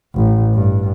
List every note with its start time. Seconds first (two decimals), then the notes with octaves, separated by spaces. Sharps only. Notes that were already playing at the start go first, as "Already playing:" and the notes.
0.15 A1
0.54 G2